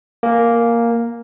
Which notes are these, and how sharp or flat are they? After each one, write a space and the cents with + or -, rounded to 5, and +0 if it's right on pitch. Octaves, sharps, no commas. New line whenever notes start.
A#3 +0 G#5 +0